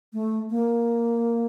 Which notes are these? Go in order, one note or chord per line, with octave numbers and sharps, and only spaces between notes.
A3
A#3